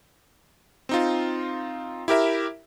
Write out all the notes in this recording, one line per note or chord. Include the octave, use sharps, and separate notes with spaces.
C4 D#4 F4
E4 G4 A#4 E5